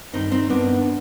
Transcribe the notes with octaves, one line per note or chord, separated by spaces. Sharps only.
G2 D#3 C4 D#4
C4 D#4
G2 D#3 B3 D4